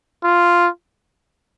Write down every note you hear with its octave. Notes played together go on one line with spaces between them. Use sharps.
F4